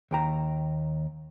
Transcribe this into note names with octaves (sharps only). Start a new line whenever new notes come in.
D#2 G5 A#5